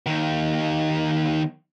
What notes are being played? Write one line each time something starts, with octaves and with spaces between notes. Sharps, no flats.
D#2 D#3